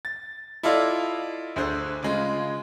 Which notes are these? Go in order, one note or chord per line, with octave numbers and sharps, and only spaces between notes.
A6
E4 F4 A4 D5 D#5 F5
D2 D3 G#4 C5
C#3 G#3 F4